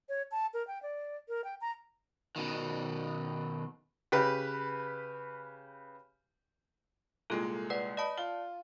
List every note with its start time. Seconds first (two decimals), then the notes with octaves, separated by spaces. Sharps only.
0.09 C#5
0.31 A5
0.54 A#4
0.67 G5
0.83 D5
1.28 A#4
1.44 G5
1.61 A#5
2.36 B2 D#3
4.12 C#3 G4 B4
7.30 C2 A#2 G#3 F4 A4
7.70 B4 D5 F#5
7.97 D5 D#5 A5 B5
8.17 F4 G7